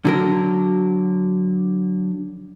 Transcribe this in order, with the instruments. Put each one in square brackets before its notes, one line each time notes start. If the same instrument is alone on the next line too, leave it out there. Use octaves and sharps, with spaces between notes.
[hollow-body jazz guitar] D3 F#3 A#4